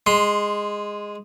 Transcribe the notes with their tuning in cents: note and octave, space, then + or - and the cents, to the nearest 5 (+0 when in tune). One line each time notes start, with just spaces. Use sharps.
G#3 -10 C6 +0